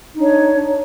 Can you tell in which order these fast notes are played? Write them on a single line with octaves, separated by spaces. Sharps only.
D#4 D4 C#5